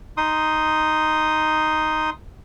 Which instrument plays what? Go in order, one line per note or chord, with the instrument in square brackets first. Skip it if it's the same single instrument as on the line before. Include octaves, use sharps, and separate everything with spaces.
[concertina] D#4 C6 D#6